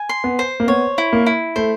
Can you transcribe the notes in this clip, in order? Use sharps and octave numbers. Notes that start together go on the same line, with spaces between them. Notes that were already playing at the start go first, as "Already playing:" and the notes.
Already playing: G#5
C6
B3
C5
A#3
B3 C#5
E4
A#3
E4
A3 C5